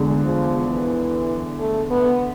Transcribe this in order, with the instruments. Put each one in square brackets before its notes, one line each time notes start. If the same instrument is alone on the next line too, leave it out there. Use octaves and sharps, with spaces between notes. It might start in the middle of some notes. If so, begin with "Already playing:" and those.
Already playing: [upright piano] E2 D3 G#3
[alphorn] F3
E3
A3
B3